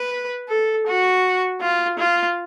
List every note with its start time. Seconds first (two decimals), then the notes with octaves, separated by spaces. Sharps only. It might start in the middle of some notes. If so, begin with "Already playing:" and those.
Already playing: B4
0.49 A4
0.87 F#4
1.60 F4
1.98 F4